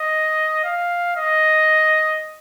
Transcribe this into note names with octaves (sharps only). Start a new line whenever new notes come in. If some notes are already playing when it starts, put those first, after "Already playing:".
Already playing: D#5
F5
D#5